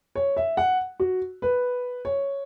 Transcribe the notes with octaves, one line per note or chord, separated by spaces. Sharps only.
C#5
E5
F#5
F#4
B4
C#5